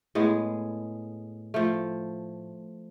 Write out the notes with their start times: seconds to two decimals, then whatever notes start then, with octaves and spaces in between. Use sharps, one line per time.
0.15 A2 G#3 B3 G#4
1.54 F3 A3